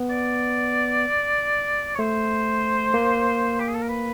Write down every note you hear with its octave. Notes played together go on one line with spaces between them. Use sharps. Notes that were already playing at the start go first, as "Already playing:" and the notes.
Already playing: B3
D5
C#5
A3 C5
A#3
G4
G#4
A4
A#4
B4